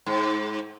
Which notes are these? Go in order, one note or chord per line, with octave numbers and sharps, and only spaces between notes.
G#2